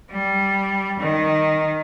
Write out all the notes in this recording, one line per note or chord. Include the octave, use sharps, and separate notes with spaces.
G3
D#3